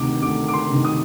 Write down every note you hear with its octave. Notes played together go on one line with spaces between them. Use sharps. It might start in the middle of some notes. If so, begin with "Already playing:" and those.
Already playing: D2 C3 D#3 D6
D2 D6
D6
C6
C3 D#3
D#6